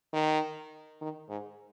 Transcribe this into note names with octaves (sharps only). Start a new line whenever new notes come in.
D#3
D#3
G#2